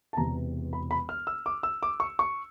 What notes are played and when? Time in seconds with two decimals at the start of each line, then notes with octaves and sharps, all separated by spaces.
0.13 A5
0.17 E1 E2 C3 A#5
0.73 B5
0.91 B5
1.09 F6
1.27 E6
1.46 D6
1.63 E6
1.83 D6
2.00 C#6
2.19 C#6